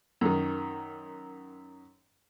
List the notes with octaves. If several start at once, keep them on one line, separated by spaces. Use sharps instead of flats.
F#2 D#3